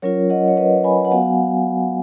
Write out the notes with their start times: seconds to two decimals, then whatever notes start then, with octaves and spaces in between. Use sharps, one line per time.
0.02 F#3 C#4 F4 A#4 C#5
0.30 D#5 F#5
0.48 C#5
0.57 B4 D#5
0.84 G#5 B5
1.05 F#5
1.11 F#3 B3 F#4 F5 G#5